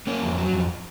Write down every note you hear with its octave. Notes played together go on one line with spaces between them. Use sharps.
A#3 C#4
F2
F#3
F2